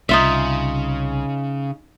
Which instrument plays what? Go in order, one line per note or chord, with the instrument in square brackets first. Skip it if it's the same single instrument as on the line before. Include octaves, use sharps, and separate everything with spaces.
[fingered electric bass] C2 [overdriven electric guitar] C#3 [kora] D#4 F4 E5